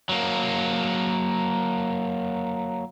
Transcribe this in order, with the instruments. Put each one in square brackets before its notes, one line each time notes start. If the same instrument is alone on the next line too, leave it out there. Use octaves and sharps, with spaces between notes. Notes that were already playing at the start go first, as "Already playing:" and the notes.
[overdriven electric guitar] F#3 A#3